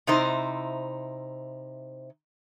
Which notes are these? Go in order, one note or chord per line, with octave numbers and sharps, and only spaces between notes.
C3 D#4 E4 C5